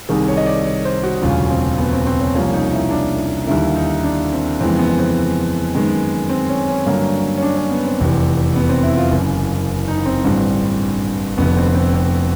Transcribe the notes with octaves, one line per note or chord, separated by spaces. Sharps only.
C2 C3 D#3 G#4
C#5
D#5
D5
C#5
C5
F#4
E1 D2 C#3 F#3 F4
C4
B3
C4
C4
C#4
C2 C3 F3 A#3 C#4
D#4
E4
D4
D#2 D3 G3 A#3 E4
D#4
D4
C4
F2 C#3 E3 G#3 B3 C4
B3
C4
F#2 D#3 G#3 B3
C4
C#4
C#4
G2 D3 F#3 A#3
C#4
D4
C#4
B3
C4
F1 E2 C3 E3
B3
C4
E4
F4
F#1 F#2 C#3
D#4
C4
A1 G2 D3 G3
F1 F2 D3 B3
C4
C4
C4